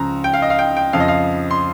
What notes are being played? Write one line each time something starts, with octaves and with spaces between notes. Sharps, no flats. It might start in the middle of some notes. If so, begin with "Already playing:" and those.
Already playing: C#2 C#3 F3 A#5
G5
F5
D#5
F5
G5
G5
F2 C#3 F3 F5
D#5
F5
C6